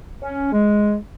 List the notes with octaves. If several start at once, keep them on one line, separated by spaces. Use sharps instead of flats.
C#4
G#3